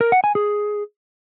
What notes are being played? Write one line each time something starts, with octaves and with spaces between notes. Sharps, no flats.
A#4
F#5
G#5
G#4